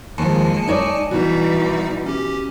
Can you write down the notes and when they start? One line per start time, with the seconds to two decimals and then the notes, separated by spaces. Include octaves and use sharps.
0.18 D#2 F3 G#3 A#3 G#5 A5 C#7
0.68 D#4 C#5 D5
1.11 B2 E3 G3 D#4 F#4
2.06 C#4 G4